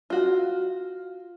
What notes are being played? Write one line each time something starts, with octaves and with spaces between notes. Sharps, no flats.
F4 F#4